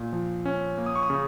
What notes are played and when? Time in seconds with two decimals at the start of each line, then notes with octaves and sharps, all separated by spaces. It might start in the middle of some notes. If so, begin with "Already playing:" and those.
Already playing: A#2
0.13 F3
0.45 C#4
0.78 A#3
0.86 D#6
0.95 C#6
1.03 D#6
1.10 C#3